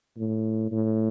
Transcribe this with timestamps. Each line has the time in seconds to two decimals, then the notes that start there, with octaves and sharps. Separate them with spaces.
0.18 A2
0.72 A2